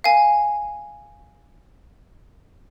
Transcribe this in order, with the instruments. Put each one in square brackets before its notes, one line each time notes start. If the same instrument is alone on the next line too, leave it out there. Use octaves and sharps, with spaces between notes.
[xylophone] F5 G#5